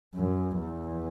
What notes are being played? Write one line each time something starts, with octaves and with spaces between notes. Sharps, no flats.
F#2
E2